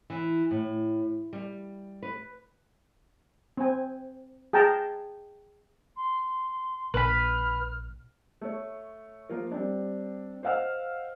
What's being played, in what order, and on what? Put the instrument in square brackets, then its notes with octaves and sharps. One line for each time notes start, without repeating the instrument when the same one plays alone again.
[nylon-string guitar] E3
A2
G3
B4
[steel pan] C4 G#5
G#4 G5 A5 A#5
[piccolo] C6
[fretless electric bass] A#1 [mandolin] B4 B5 [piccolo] F6
[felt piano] A3 C#5
F3 A#3 F4 A#4
G3 C4 D4
C5 D#5 F5 F#5 E6 F6